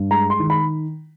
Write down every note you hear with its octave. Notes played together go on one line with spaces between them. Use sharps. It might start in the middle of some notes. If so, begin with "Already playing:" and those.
Already playing: G2
G#3 A#5
C6
D#3
B5